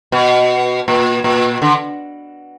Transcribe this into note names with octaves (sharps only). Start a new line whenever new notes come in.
B2
A#2
A#2
D3